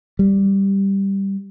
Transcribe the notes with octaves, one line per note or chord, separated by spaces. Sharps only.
G3